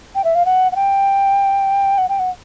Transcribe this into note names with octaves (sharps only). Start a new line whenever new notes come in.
G5
E5
F5
F#5
F#5
G5
F#5
G5
F#5